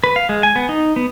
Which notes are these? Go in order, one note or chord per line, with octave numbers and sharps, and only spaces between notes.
B4
F5
G#3
G#5
B3
D#4
B3